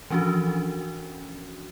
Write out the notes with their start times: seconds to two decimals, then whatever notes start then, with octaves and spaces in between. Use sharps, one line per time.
0.10 E3 F3 C#4 D4 F#4